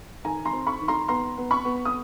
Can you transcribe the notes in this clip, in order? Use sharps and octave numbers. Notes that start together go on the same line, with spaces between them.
D#3 G#5 A#5
A#5 C6
C4
B5 C#6
D#3
A#5 C6
B3 A#5 C6
B3
B5 C#6
B3
D#6